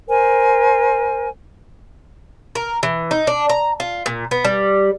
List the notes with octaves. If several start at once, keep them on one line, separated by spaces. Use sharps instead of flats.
A#4 C5 G#5
A#4
E3
D#4
D4
A#5
F4
A#2
B3
G3